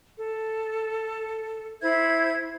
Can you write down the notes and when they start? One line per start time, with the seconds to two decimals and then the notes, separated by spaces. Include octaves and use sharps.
0.16 A4
1.82 E4 C5 E5 G#6